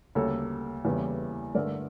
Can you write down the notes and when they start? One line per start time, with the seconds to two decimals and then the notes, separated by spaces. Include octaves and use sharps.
0.15 D2 C#3 G3 A#3 A4 C#5
0.85 E2 C#3 E3 G3 A#3
1.55 G2 D3 A3 A#4 D5